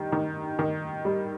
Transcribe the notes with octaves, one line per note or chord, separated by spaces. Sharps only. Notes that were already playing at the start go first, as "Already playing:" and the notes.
Already playing: D#3 G3
D#3
D#3
G3